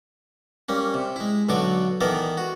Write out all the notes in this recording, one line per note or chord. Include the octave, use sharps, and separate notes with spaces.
G3 A#3 C#4
C3
G#3 E4
B1 D3 F#3 F#4 C#6 D6
D#3 E3 B3 A4 A#4 D5
F#4